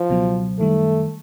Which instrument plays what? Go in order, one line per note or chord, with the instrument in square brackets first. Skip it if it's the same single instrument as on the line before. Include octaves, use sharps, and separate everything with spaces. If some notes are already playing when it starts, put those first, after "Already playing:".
Already playing: [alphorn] F3
[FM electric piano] C#2 B2 F#3
[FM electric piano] F#2 D#3 G3 [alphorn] A3